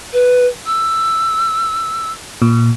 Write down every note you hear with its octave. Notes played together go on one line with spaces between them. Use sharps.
B4
E6
A#2